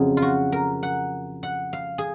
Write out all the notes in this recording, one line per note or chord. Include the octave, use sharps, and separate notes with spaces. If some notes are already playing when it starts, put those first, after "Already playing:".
Already playing: F2 C#3 F#3 C4 G#4
F4
F#4
A#4
F#5
F#5
F5
G#4